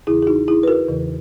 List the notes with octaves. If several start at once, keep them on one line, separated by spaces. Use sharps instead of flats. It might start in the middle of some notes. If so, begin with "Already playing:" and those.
E2 C#3 E3 E4 G#4
G#4
D#4 F#4
E4 G#4
B4
F#4 A#4
E2 C#3 E3